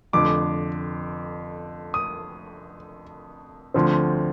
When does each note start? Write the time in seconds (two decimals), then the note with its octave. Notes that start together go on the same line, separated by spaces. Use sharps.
0.13 F1 F2 D3 D6
1.94 D#6
3.74 D2 D3 F3 C4